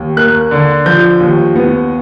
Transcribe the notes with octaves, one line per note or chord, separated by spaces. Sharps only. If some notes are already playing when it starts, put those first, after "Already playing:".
Already playing: D#2
A#3 F#6
D3
F3 G6
D#2
B3